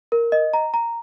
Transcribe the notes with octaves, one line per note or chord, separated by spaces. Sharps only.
A#4
D#5
A#5
A#5